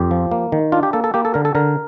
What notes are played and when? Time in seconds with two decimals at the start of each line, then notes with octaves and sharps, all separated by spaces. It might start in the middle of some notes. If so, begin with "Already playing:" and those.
Already playing: F2 G4
0.11 F3
0.31 A#3
0.52 D#3
0.72 D4 F4
0.83 G4
0.93 A#3 A4
1.04 A4
1.14 A#3 G4
1.25 A4
1.34 D3 A#4
1.45 A4
1.55 D3 A#4